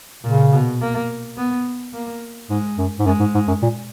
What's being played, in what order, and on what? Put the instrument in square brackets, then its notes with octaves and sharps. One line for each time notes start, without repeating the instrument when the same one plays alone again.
[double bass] A#2 [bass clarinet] C#3
[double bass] B2
A#3
B3
A#3
[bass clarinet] G#2 [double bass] G#3
[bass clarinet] F#2
G#2
[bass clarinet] F#2 [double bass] G#3
[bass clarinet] G#2
G#2
F#2
A#2